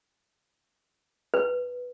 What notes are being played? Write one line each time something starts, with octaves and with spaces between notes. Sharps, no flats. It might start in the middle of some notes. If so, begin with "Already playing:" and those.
B4